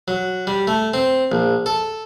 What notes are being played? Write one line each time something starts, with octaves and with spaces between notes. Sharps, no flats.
F#3
G3
A3
C4
A#1
A4